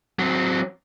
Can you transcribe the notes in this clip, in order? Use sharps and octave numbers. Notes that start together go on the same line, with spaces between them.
F#3 C4